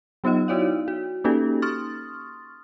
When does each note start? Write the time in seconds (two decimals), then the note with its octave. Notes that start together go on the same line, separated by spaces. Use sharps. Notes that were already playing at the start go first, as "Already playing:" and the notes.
0.24 F#3 B3 D#4 F4 D#5
0.48 D#4 E4 F#4 C#5 D5 F5
0.88 F#4
1.24 A#3 C#4 D#4 F#4 G4 A4
1.62 C6 C#6 D#6 F6 A6